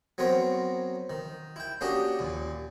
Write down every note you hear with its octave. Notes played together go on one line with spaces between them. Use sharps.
F#3 B3 C4 A#4 C#5
D#3
E4 G5
A#3 C#4 D4 F#4 G4 D#5
D#2 A#2